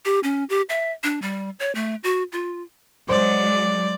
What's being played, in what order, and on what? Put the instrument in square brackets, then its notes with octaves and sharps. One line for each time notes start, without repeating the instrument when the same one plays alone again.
[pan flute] G4
C#4
G4
E5
D4
G3
C#5
A3
F#4
F4
[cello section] F#3 G#3 [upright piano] C5 [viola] D5